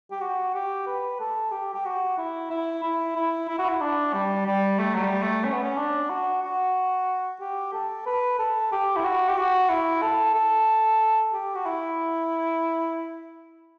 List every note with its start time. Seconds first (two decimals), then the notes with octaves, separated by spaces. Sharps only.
0.11 G4
0.21 F#4
0.54 G4
0.87 B4
1.20 A4
1.52 G4
1.74 G4
1.85 F#4
2.18 E4
2.50 E4
2.83 E4
3.16 E4
3.48 E4
3.59 F#4
3.69 E4
3.81 D4
4.14 G3
4.46 G3
4.79 A3
4.94 F#3
5.01 G3
5.22 A3
5.44 C#4
5.53 B3
5.63 C#4
5.77 D4
6.10 F#4
6.43 F#4
7.40 G4
7.73 A4
8.06 B4
8.39 A4
8.72 G4
8.96 E4
9.04 F#4
9.28 G4
9.37 F#4
9.70 E4
10.02 A4
10.34 A4
11.33 G4
11.55 F#4
11.66 E4